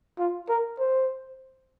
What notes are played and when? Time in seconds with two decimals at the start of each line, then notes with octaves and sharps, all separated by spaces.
0.19 F4
0.49 A#4
0.79 C5